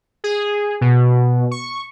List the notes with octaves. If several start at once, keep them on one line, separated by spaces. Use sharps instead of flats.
G#4
B2
C#6